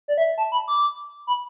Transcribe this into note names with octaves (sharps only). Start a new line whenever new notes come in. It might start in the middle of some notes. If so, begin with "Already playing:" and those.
D5
E5
A5
B5
D6
B5